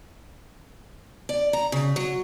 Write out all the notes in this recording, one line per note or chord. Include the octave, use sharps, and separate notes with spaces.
D5
A#5
C#3
F#3